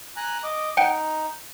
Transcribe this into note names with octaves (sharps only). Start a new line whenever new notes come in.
G#5 A#5 F#6
D#5 D6
D#4 F#5 G5